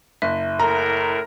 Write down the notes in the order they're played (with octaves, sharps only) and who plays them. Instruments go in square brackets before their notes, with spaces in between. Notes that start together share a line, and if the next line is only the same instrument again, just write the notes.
[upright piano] F#1 [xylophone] E5
[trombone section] A2 A#4 [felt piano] A#5